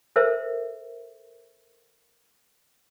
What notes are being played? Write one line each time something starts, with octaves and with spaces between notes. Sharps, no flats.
A4 A#4 C5 E5